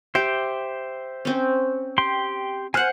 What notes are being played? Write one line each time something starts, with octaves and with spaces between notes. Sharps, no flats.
G4 C5 E5 G5
C4 C#4
G4 G5 C6
C5 F#5 G#5 F6 F#6